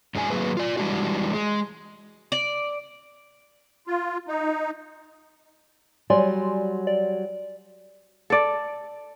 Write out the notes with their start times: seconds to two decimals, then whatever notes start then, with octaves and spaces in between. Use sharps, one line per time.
0.15 F#2 F#3 G#3 D4 G#5
0.30 F#3 A#3 G#4 B4
0.57 F4 D5
0.77 E3 G3 G#3 D4 F4 F#4
1.33 G#3
2.32 D5
3.87 F4
4.28 D#4
6.10 F#3 G3 D5 G#5 C6
6.87 D5
8.30 A4 D5